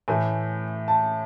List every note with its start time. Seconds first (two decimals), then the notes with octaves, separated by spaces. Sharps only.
0.08 A2 E3 A3 G#5
0.88 A5